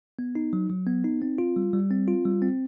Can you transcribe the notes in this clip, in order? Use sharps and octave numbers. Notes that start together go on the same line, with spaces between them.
B3
D#4
F#3
F#3
B3
D#4
C4
F4
G3
G3
C4
F4
G3
C4